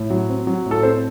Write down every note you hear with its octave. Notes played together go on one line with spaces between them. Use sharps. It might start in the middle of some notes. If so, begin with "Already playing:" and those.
Already playing: A2
F#3
C4
F#3
A2
A4
C4 C5